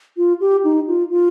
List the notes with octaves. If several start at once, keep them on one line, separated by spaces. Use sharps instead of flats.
F4
G4
D#4
F4
F4